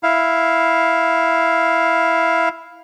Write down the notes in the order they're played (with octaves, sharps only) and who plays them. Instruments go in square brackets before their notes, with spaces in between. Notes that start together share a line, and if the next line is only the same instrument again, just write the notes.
[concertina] E4 F5